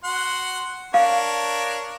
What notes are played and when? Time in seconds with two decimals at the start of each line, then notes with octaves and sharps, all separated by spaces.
0.04 F#4 F#5 C6
0.94 D4 A#4 C#5 F5